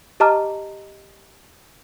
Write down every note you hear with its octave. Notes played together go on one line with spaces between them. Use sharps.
G4 D#5 A5 A#5 D6 F6